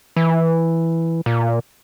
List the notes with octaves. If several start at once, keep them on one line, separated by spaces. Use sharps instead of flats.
E3
A#2